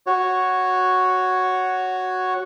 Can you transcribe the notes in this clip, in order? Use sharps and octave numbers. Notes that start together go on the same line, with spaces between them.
F#4 C#5